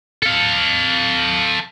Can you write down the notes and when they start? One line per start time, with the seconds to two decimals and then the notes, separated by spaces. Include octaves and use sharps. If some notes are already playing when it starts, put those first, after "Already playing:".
0.23 A4 F5